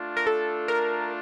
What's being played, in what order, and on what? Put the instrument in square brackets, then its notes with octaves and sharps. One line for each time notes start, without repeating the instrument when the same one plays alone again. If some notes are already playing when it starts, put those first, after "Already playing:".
Already playing: [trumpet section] A3 D4 F4
[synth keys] A#4
A4
A#4